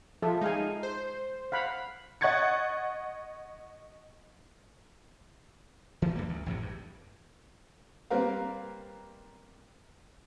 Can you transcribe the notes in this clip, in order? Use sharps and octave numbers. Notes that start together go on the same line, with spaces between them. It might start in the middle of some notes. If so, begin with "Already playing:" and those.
F3 F4 A4 E5
G#3 D#4 F5 G#5
C5
F5 F#5 B5
D#5 F#5 C#6 G#6 A6 C#7
E3 F3 A3
G2 D3 A#3
D2
A1 F2 A2 C3
G2
G3 A#3 C4 A#4 B4 F5